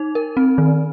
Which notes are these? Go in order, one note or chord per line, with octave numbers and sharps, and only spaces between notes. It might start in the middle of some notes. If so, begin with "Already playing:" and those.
Already playing: D#4
A#4
C4
D#3